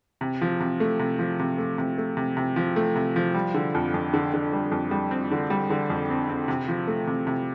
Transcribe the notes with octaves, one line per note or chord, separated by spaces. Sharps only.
C3
F3
C3
A3
C3
F3
C3
A3
C3
A3
C3
C3
F3
A3
C3
F3
G3
D3
F2
F2
D3
D3
G3
F2
G3
C4
D3
G3
D3
F2
C4
C4
C3
F3
A3
C3
C3